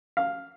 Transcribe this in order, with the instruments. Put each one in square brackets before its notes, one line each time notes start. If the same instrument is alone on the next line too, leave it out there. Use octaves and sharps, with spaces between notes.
[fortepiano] F5